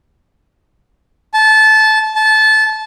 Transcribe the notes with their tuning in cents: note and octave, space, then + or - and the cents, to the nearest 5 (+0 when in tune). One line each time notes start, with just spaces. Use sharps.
A5 -20
A5 -20